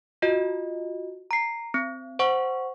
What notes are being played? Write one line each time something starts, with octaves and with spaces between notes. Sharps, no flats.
F4 F#4 D#5
A#5 C7
C4
C5 F#5 C#6